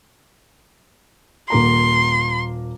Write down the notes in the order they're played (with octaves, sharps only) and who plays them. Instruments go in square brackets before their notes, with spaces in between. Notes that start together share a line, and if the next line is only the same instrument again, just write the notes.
[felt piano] D#1 A#3 A#5 [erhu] C6